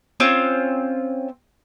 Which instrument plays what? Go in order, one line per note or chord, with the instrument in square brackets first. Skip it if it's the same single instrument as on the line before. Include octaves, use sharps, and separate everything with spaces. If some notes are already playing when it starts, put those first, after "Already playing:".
[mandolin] C4 C#4 F4